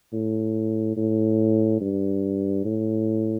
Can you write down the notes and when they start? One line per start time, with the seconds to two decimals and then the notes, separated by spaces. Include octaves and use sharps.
0.13 A2
0.97 A2
1.81 G2
2.65 A2